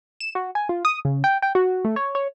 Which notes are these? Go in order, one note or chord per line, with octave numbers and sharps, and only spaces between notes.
E7
F#4
G#5
F4
D#6
C#3
G5
G5
F#4
A3
C#5
C#5